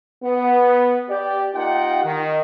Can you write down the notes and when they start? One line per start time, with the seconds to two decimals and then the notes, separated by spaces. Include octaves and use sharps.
0.23 B3
1.09 G4 D5
1.54 A#3 D#4 F4 G4 F#5 G5
2.04 D#3